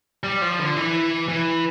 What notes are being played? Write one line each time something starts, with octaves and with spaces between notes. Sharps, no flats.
G3
F3
D3
E3
E3